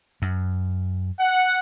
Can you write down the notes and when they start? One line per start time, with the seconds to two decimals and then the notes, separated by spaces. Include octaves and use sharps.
0.22 F#2
1.20 F#5